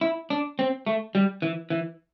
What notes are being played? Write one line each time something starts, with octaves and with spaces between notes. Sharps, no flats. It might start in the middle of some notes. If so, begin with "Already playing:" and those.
E4
D4
C4
A3
G3
E3
E3